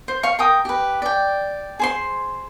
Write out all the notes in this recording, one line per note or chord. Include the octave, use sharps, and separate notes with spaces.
C5
F5 C#6
A#4 G5 D#6
G4 B4
D5 G5
G#4 C5 C6